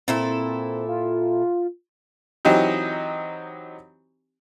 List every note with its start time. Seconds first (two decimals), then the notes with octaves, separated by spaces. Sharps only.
0.08 A#2 C4 E4 A4
0.88 F4
2.45 E3 F#3 C4 D#4 G4